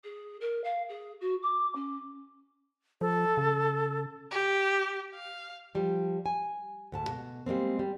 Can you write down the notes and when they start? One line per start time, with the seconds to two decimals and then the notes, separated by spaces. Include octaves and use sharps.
0.03 G#4
0.40 A#4
0.63 F5
0.88 G#4
1.20 F#4
1.42 D6
1.75 C#4
3.01 F3 A4
3.37 C#3
4.31 G4
5.14 F5
5.75 F3 G3
6.26 G#5
6.92 D2 G#2 A5
7.09 B2
7.46 G3 G#3 A#3 C4
7.79 G3